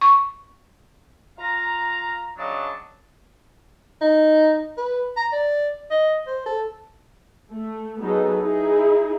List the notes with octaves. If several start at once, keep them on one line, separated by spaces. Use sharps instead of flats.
C#6
F4 F5 A#5
C#3 F#3 D4 D#5 A5
D#4
B4
A#5
D5
D#5
C5
A4
A3
F#3 B3 D#4 G#4 A4 B4
D#4 E4 G#4